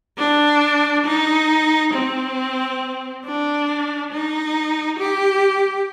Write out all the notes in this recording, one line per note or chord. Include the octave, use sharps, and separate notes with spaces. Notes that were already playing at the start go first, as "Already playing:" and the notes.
D4
D#4
C4
D4
D#4
G4